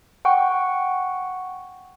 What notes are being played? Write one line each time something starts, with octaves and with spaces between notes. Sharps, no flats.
F#5 G5 C#6